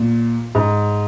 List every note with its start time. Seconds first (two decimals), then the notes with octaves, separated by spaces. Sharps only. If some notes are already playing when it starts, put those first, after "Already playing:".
Already playing: A#2
0.55 G#2